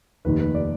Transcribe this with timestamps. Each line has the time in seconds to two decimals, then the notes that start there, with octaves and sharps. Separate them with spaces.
0.25 F1 D#2 D#3 B4
0.40 B4
0.54 D5